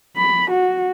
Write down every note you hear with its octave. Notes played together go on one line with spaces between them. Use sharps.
B5
F#4